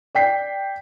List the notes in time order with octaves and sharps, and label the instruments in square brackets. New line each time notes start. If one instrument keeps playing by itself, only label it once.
[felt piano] D5 G5 B6 C7